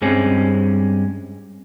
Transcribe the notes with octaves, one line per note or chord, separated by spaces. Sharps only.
G2 G3 G#3 C4 C#4